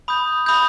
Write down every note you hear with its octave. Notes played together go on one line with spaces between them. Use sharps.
B5 D#6 G6
B5 D#6 G6